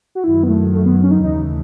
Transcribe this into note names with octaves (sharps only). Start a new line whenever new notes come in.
F#4
F#2 D#3 F#3 E4
B3
A3
A3
B3
C#4
D#4
D#2 C#3 E3 A3 D#4